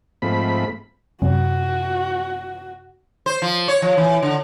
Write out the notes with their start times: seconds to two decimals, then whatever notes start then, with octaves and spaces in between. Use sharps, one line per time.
0.22 G#2 F3 A3 C4 B5
1.22 F#2 C3 F#4
3.26 C5
3.42 F3
3.68 C#5
3.82 F3
3.97 E3
4.23 D3